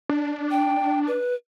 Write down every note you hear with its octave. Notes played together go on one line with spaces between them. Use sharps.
D4
G5
B4